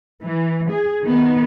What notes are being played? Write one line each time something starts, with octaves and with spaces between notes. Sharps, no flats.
E3
G#4
D#3 B3